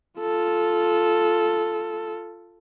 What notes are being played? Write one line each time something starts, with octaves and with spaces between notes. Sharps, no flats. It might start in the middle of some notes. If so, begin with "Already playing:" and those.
F4 A4